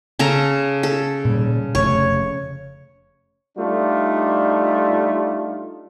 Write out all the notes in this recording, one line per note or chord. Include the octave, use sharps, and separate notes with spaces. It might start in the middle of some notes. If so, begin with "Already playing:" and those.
C#3 A4 A#5
A4
A#2 G3
F1 C#3 A3 C#5
G3 A3 D4 D#4 F4